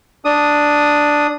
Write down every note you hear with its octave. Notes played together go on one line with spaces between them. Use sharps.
D4 D#6